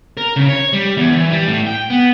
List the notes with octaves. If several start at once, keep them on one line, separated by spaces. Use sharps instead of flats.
A#4
C#3
C#5
G3
E2
E3
G3
A2
G5
B3